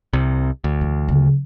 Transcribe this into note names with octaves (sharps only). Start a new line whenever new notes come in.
C2 C3
D2
E3
C#3 F#3